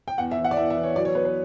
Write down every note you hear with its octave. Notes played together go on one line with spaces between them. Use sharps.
G5
E2 F#5
E5
E3
F#5
D5
E2 E5
E5
E3
C#5
F#3 D5
C#5
B3 B4
B4